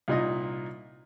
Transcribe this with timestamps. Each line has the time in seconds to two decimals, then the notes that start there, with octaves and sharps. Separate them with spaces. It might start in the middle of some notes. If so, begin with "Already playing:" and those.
0.08 C2 A#2 D#4 D#5